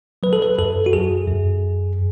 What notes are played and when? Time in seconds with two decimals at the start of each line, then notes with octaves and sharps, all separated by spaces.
0.23 F#3 B4
0.33 A4
0.42 B4
0.58 F#2 A4
0.86 F#4
0.93 F#2 G#4
1.28 F#2